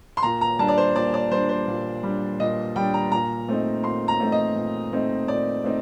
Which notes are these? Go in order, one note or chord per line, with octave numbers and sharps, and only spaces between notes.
C6
A#2 A#5
A#5
G3 D4 A5
D5
C5
A#2 D5
D5
G3 D4 C5
C5
A#2
G3 D4
A#2 D#5
G3 D4 G5
A#5
A#2 A#5
A3 C4 D#4
A#2 C6
A#5
A3 C4 D#4
D#5
A#2
A3 C4 D#4
A#2 D5
A3 C4 D#4